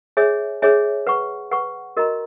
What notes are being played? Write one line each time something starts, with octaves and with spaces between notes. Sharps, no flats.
G#4 C#5 E5 G#5
G#4 C#5 E5 G#5
B4 F#5 C#6
B4 F#5 C#6
F#4 A#4 D#5 A#5